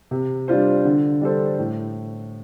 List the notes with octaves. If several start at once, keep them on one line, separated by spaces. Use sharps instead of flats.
C3
G3 D4 F4 C5
D3
G3 D4 A4 C5
A2